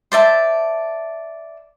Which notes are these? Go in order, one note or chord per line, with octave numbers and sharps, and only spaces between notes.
C5 D5 E5 A5